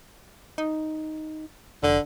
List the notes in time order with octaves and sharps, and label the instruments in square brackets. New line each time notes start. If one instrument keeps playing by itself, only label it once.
[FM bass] D#4
[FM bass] F1 [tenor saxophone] D3